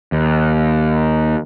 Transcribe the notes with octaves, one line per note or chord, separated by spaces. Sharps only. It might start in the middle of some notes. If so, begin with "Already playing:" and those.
D#2